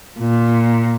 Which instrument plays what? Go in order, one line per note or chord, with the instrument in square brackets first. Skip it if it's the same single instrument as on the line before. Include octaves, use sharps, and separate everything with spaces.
[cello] A#2